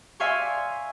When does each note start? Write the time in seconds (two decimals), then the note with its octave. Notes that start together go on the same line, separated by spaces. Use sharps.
0.20 D5 E5 F5 G#5 C6 C#6